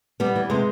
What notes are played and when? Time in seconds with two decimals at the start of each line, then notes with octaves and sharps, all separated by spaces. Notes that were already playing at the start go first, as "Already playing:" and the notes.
0.20 G3 B3
0.36 E3
0.50 C3 G#3